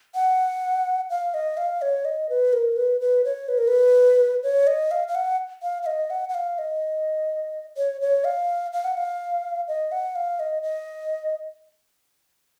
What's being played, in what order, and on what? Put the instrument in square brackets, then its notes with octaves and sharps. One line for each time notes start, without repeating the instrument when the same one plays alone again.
[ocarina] F#5
F5
D#5
F5
C#5
D#5
B4
A#4
B4
B4
C#5
B4
A#4
B4
C#5
D#5
F5
F5
F#5
F5
F5
D#5
F#5
F#5
F5
D#5
C#5
C#5
F5
F5
F#5
F5
D#5
F#5
F5
D#5
D#5